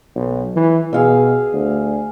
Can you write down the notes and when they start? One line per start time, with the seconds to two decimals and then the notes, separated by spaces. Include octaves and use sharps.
0.15 B1
0.56 E3
0.93 B2 G#4 F5 E6
1.53 D2